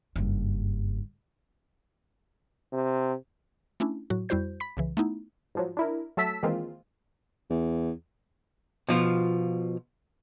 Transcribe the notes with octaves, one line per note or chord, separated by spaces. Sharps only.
F#1 G2
C3
A3 C#4 D4 E4
A2 F#3 F#4
F2 G3 E4 F#4 C5 G6
B5 B6
C2 C#3 E3
A3 B3 D#4 E4
G#2 F3 F#3
D4 E4 A#4
F#3 A3 A5 E6 B6
D#3 E3 G#3 A#3 C4 F4
E2
B2 F3 F4